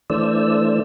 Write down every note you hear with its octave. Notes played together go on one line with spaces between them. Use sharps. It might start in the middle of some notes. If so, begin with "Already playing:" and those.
E3 A3 D4 C5 D5 E6